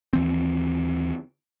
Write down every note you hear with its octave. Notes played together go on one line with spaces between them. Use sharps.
D#2 E3 C4